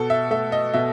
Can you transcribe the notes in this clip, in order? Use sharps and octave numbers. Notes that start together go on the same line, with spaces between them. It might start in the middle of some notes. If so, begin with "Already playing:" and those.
Already playing: B2 A4
E5
A3 E5
D#5
B2 E5